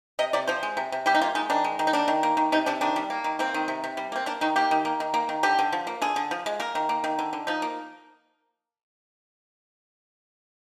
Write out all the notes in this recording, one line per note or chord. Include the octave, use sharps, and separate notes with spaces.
C3 D#5
C3 D5
F3 C5
G#3
C3
C3
G3 G4
D#4
A#3 F4
G#3 D#4
D#3 D4
G#3
D#3
D#4
A#3 D4
D#3
A#3
D#3
C3 D#4
C3 D4
D#3 D4
G3
A#3
D#3
A#3 C4
D#3
C3
C3
G3
A#3 C4
A#3 D4
D#3 D#4
A#3 G4
D#3
A#3
D#3
A#3
D#3
D3 G4
D3
F3
A#3
D3 G#4
D3
F3
G#3
A#3 A#4
D#3
A#3
D#3
D3
D3
F3 D#4
A#3